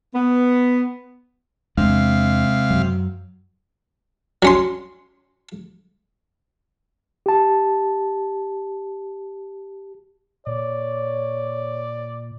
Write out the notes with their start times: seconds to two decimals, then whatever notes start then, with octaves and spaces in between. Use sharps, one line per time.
0.15 B3
1.77 E2 C3 G#3 D4 F5
2.71 F#2 F#3
4.42 F#3 C#4 C6
7.26 G4 A5
10.47 A#2 C#5 D5